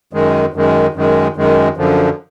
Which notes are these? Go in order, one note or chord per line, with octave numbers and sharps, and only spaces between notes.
F#2 D#3 G#3
F#2 D#3 G#3
F#2 D#3 G#3
F#2 D#3 G#3
F#2 D3 F3